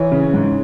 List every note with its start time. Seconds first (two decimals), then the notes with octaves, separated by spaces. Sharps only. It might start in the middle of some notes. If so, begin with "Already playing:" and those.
Already playing: E3 C#5
0.12 C#3
0.34 G#2